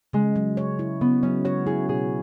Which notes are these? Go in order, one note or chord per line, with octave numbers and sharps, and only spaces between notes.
C#3 G#3
F#3
C#5
E4
C#3 B3
F#3 C#4
F#4 C#5
E4 G#4
B2 G#4